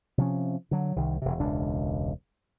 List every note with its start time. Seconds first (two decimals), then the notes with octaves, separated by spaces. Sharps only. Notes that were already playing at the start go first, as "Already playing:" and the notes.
0.18 C3 F3 C#4
0.71 D3 F#3
0.96 C2 D#3
1.22 E1 C3
1.40 E1 C#2 D4